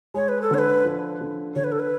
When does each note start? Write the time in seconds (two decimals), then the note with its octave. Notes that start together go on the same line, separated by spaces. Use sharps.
0.14 G#3 C#5
0.28 B4
0.42 A4
0.51 D3 C#5
0.58 B4
0.85 F3
1.21 D3
1.56 D3 C#5
1.64 B4
1.72 A4
1.79 B4